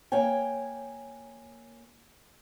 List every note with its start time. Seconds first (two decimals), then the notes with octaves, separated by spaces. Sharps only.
0.12 A#3 C#5 G5 G#5